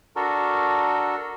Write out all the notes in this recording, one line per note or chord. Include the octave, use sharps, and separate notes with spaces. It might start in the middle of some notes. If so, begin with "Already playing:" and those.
D4 F#4 A4 A#4